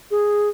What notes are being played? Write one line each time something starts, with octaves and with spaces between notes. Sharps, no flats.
G#4